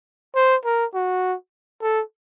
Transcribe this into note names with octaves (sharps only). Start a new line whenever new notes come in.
C5
A#4
F#4
A4